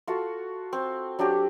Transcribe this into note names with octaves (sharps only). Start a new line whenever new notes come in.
F4 F#4 A4
C4
F#3 D4 F#4 G4